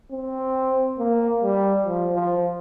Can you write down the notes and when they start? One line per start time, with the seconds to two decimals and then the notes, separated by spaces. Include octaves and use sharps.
0.12 C4
0.98 A#3
1.43 G3
1.86 F3
2.15 F3